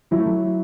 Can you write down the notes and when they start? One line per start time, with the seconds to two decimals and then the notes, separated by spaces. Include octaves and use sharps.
0.11 F#3 E4
0.19 A3
0.26 F#3